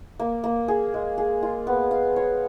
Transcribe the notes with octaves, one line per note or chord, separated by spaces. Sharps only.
A#3
A#3
G#4
G#3
G#4
F4
B3
F5
C#5